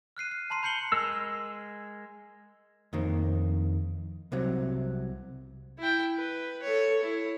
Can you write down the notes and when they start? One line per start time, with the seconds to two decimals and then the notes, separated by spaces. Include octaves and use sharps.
0.17 F6 F#6 C7 D#7
0.31 C7
0.50 A5 A#5 C6 C7 D#7
0.63 B5 G6 C7 C#7 F#7 G7
0.92 G#3 A#4 E6
2.93 F2 D#3 A#3
4.32 C2 C3 F#3
5.79 E4 G5
6.16 B4
6.62 A4 C#5
7.03 E4